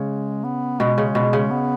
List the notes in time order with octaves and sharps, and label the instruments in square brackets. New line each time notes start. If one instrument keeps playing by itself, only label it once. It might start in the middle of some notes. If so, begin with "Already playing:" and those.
Already playing: [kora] C#3 [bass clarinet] G#3
[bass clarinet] B3
[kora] B2 [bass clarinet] G#3
[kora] C#3
B2
C#3
[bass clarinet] B3